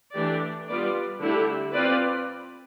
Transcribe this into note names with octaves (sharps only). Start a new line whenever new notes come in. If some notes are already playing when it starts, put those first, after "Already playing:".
E3 A3 D4 G4 D5
G3 B3 F4 B4 D5
D3 A3 E4 G4
C4 F4 B4 D5